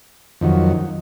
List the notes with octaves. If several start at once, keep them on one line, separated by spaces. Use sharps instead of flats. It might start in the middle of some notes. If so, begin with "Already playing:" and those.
F2 D#3 F#3